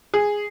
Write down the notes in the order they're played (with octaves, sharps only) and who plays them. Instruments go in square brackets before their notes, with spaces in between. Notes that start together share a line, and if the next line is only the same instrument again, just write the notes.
[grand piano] G#4